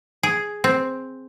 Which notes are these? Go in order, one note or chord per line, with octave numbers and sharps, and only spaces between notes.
G#4
C4